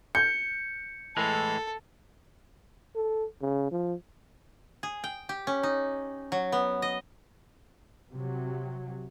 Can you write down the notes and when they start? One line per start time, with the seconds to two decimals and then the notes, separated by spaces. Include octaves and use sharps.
0.15 G6 C#7
1.17 A2 E3 G#3 A4
2.96 A4
3.42 C#3
3.71 F3
4.83 G#4
5.04 G5
5.29 G4
5.47 C#4
5.63 D#4
6.32 F#3
6.52 B3
6.82 D#5
8.12 C3 F#3